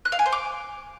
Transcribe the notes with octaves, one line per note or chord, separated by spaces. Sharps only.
F#6
F5
G#5
C5
D6